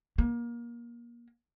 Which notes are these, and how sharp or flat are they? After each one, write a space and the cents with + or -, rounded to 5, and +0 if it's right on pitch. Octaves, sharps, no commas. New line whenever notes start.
A#3 +25